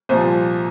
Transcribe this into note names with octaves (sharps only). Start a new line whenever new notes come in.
C2 A#2 F3 C5